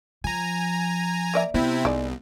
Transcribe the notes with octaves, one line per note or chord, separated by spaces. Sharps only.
F3 G#5 A#5
A#3 D5 E5
C3 B3 C4 E4
C2 G#3 D#4 D5